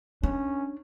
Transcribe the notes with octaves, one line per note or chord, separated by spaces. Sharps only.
C#4 D4